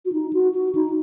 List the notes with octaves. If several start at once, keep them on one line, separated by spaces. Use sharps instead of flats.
F#4
D#4
F#4
F#4
D#4